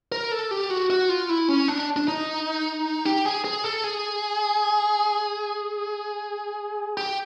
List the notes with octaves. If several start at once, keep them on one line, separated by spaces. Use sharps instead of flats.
A#4
A4
G4
F#4
F#4
F4
E4
C#4
D4
D4
D#4
G4
G#4
G#4
A4
G#4
G4